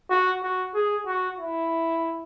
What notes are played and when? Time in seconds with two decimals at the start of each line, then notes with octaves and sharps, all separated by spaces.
0.11 F#4
0.43 F#4
0.75 G#4
1.07 F#4
1.38 E4